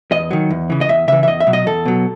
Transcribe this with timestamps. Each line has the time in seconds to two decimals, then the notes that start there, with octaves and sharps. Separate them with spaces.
0.11 E2 D#5
0.31 D#3 F#3
0.50 E2
0.70 C#3 E3
0.81 D#5
0.89 E2 E5
1.08 C#3 E3 E5
1.23 E5
1.27 E2 D#5
1.40 E5
1.47 B2 F#3
1.53 D#5
1.66 E2 A4
1.85 B2 F#3